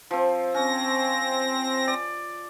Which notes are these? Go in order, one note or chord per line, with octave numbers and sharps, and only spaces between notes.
F3 C4
C4 C#4 A#6
D5